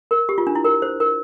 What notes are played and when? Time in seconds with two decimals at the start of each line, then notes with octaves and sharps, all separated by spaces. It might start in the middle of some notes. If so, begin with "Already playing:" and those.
0.11 A#4
0.29 G4
0.38 F4
0.47 D4
0.55 E4
0.65 A#4
0.82 C5
1.00 A#4